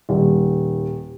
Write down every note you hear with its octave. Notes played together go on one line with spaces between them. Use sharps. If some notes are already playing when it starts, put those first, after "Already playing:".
D#1